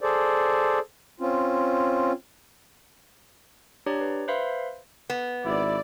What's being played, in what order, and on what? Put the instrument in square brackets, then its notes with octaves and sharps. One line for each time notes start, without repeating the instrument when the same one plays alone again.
[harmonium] G#4 A4 C5 D5
C4 C#4 F4
[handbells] D4 G4 C#5 D5 A#5
B4
B4 C5 E5 F5 B5 C6
[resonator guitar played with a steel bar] B3
[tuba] G#1 [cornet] E4 [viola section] D5